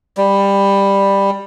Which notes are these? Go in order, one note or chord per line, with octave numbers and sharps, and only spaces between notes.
G3